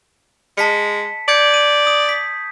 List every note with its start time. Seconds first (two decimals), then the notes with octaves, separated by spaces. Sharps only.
0.58 G#3 A5 B6 C#7
1.28 D5 G6 G#6 C#7
1.54 D#7
1.87 D#6
2.09 B6